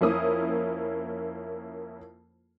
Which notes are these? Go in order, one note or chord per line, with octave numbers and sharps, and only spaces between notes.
F2 A#3 C#4 E4 D#6